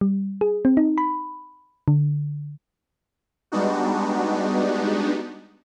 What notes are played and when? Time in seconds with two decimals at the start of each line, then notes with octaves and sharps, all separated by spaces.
0.01 G3
0.41 G#4
0.65 C4
0.77 D#4
0.98 B5
1.88 D3
3.52 G3 G#3 B3 D4 D#4 F#4